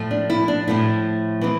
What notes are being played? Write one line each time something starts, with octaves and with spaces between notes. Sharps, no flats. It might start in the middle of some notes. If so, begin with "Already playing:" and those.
Already playing: A2 F3 A3
D4
E4
D4
A2 F3 A3 C4 E4
E3 G#3 C4